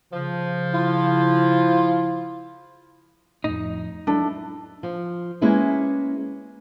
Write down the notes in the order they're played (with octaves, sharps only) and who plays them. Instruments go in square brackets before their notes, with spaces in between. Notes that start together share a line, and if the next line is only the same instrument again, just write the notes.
[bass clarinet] C#3 [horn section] F3
[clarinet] E4 [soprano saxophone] F4
[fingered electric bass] F2 A2 [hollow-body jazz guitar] D#4
[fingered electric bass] F#3 G#3 [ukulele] D4 E4 A4
[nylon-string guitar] F3
G#3 A#3 C#4 E4 G#4 B4